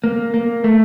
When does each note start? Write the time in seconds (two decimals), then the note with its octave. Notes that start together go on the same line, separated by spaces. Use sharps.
0.04 A#3
0.34 A#3
0.64 A3